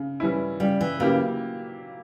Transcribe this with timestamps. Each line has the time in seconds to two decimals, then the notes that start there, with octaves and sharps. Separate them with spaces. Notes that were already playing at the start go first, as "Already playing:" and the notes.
Already playing: C#3
0.20 E3 G3 C#4 E4
0.60 C#3 G3
0.81 E3
1.00 C#3 F#3 A#3 E4 G4